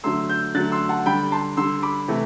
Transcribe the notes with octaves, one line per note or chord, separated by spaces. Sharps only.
D3 F#3 A3 C6 E6
E6 G6
D3 F#3 A3 F#6 A6
C6 E6
F#5 A5
D3 G3 G5 B5
A5 C6
D3 G3 C6 E6
B5 D6
C3 E3 A3